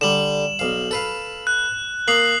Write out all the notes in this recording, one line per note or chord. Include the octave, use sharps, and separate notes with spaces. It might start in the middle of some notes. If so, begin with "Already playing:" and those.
D3 G3 E7 F#7
B1 F5
A4 B4 F5
F#6
A#3 D#6 C7 F#7